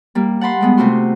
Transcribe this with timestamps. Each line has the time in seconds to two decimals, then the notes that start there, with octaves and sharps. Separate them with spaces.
0.15 G3 A#3
0.41 F#5 A5 B5 C6
0.61 G3 G#3 B3
0.77 C3 A3 F4 F#4 C6